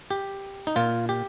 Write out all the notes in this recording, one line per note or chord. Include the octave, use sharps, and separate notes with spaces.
G4
D#4
A#2 F4
G4